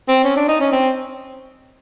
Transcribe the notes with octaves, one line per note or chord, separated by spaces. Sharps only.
C4
C#4
D4
D#4
C#4
C4